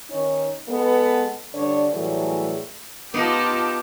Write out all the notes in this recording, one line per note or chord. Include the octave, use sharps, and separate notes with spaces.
D#3 C#4 D#4 C#5
G#3 B3 A4
G2 D3 D4 C#5 D5
A2 E3 F#3 G3 A3 G#4
B3 D#4 F4 G4 A5 D6